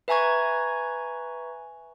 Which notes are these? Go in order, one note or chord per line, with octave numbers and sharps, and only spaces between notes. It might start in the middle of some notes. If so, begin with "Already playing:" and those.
B4 E5 G#5 A#5 C#6 G#6